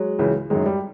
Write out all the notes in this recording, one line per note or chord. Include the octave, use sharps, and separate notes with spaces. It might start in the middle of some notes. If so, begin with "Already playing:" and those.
Already playing: F#3 G#3
C#2 C#3 E3
F#2 D#3 F#3 G#3
G3